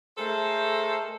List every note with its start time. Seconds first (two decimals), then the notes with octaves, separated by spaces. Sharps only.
0.17 G#3 A3 A4 A#4 C5